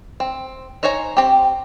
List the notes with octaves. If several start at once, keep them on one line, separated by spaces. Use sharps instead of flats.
C4
D#4 C5 C#5 G#5 A#5
C4 G4